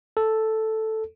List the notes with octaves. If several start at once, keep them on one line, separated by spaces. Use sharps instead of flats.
A4